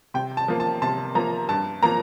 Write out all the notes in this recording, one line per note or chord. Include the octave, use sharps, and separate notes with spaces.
C3 G5
A5
F3 A#3
A5
C3 A5
F3 A#3 A#5
G2 A5
F3 A#3 A#5